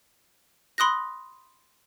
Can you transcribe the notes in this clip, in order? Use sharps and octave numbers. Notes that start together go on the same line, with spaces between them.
B5 C6 D#6 F#6 A#6